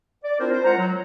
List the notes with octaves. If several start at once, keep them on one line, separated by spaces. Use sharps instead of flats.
D5
C4 D4 E4 F4 A#4 C5
C5
G#3 F4 A#4 F#5 A#5
F#3